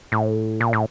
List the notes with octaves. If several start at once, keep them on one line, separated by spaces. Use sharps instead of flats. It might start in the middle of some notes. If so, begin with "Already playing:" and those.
A2
A#2
A2